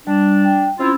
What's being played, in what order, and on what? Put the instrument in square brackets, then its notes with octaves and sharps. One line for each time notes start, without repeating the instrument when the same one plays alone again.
[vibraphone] G3 [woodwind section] D4
[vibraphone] G5
[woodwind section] C4 E4 F4 [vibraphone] C#4 E6